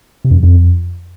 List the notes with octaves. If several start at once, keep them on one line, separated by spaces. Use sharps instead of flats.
C3
F2
F#2
F2